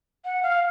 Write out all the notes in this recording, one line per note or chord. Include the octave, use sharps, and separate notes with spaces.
F#5
F5